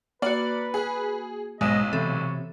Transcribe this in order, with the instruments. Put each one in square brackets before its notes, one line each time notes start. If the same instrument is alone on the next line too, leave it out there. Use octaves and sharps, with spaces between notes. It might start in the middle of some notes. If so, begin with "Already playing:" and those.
[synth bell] A#3 F#4 [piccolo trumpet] B4 [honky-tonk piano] D5
[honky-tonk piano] G#4
[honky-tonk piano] B1 [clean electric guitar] G#2 [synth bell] G#3 E7 [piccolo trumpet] D#5
[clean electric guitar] C3 [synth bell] E3 A4 [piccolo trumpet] C#5